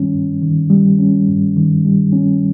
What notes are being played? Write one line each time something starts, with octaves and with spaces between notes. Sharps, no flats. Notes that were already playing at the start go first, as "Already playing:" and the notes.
Already playing: G2 D#3 G3 C#4
G2
D#3
G3
C#4
G2
D#3
G3
C#4